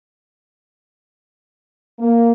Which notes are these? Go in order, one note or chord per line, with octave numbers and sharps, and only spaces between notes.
A#3